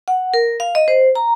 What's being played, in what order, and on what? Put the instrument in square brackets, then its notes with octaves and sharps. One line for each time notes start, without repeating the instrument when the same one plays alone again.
[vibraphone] F#5
A#4
F5
D#5
C5
A#5